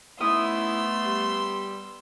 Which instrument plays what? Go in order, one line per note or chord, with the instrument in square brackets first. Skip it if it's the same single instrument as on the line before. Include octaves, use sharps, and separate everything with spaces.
[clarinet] A3 [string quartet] B3 C6 E6 [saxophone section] C#4 D#4 E4 [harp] D#6
[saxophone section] G3